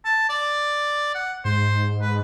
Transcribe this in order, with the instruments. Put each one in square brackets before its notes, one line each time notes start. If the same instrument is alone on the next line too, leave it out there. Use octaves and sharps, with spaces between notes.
[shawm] A5
D5
F#5
[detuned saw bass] G#2 [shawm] C5
[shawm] B4